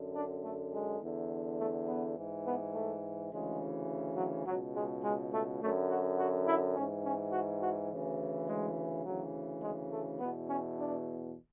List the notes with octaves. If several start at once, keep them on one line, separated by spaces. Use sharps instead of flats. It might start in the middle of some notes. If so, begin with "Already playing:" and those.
Already playing: F#2 D3
D4
A3
G#3
E2 D3
A3
B3
G#2 E3
B3
A3
D2 C#3 E3 G#3
F#3
C#2 B2 F#3
G#3
G#3
A3
F#2 D3 A3
F#4
F#4
E4
G#2 E3 C#4
C#4
F#4
F#4
D2 C#3 E3
G#3
D2 C#3 E3 F#3
G#3
A3
E2 B2 B3
C#4
D4